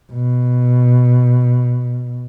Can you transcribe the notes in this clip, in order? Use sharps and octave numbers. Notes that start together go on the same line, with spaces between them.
B2